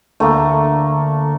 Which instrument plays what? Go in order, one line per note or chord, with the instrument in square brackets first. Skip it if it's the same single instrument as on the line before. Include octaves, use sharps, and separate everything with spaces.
[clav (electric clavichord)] D2 [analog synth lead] D3 [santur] A3 A#3